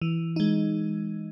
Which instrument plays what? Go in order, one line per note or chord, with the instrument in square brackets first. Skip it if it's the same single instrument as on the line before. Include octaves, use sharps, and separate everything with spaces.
[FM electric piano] E3
G#3 D#4